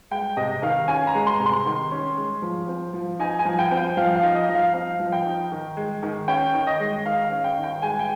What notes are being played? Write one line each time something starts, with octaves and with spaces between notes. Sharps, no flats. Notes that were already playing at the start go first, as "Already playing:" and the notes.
G#3 G5
C3 D#5
D#3 F5
C#4 G#5
A#5
G#3
C6
C3
C6
D#3
C#4
G#3
F3
C4
F3
D#4 G#5
G#5
F3
G5
C4
G5
F3 F5
F5
D#4
D#5
F3
F5
C4 F5
F3
G5
D#4
D#3
G#3
D#3
C#4 G5
D#3
D#5
G#3
D#3 F5
F5
C#4
G5
D#3
G5
G#3 G#5
G5